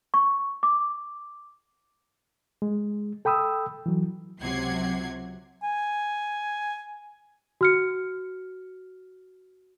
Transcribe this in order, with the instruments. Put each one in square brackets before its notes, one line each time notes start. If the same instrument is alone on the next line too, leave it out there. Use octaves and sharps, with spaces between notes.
[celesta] C#6
D6
[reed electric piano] G#3
A4 G5 B5 D#6 E6
E3 F#3
[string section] C#2 C3 F#3 F#5 G#6 C7
[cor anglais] G#5
[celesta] F#4 F6 C#7